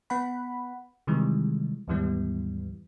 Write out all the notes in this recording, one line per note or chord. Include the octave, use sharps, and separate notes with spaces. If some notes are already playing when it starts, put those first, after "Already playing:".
B3 F#5 B5
C3 D#3 E3 G3 G#3
D#2 G#2 E3 G3 B3